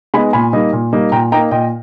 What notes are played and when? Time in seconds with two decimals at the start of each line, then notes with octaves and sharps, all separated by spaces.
0.14 G#3 B3 D#4 G#5 B5
0.33 A#2 G#5 B5
0.53 G3 A#3 D#4
0.73 A#2
0.93 G3 A#3 D#4
1.12 A#2 G5 A#5
1.32 A#3 D#4 G5 A#5
1.51 A#2 D#5 G5